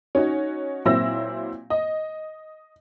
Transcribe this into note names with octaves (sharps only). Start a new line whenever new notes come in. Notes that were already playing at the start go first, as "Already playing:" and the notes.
C#4 D#4 F#4
A#2 F#3 C4 E4 E6 A#6
D#5